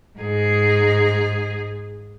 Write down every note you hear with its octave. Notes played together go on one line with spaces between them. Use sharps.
G#2 G#4